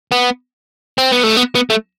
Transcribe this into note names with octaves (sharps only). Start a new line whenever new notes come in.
B3
C4
B3
A3
B3
B3
A3